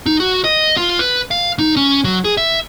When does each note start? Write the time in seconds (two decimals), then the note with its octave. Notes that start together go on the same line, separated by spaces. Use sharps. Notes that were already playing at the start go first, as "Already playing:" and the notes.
0.06 D#4
0.20 F#4
0.44 D#5
0.77 F4
0.99 B4
1.31 F5
1.59 D#4
1.77 C#4
2.04 F#3
2.25 G#4
2.37 E5